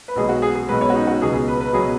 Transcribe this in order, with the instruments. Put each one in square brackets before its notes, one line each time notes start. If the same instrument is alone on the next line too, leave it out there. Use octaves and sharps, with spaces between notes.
[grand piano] B4
B1 B2 G#3 G#4
F#4
G#4
G#4
B1 B2 G#3 B4
C#5
F#4
D#4
F#4
C#2 B2 F#3 G#4
G#4
B4
B4
B2 F#3 G#4